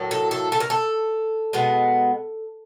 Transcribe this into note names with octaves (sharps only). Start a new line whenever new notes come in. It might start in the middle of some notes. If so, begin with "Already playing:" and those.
Already playing: A2 F#3 A#3
A4
A4
A4
A#4
A4
B2 G#3 B3